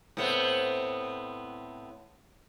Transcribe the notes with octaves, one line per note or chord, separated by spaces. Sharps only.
A2 B3 C4